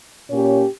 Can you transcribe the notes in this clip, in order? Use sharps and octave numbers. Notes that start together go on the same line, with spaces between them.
A#2 A#3 C#4 G4 C#5